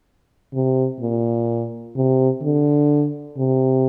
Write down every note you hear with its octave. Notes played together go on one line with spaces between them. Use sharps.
C3
A#2
C3
D3
C3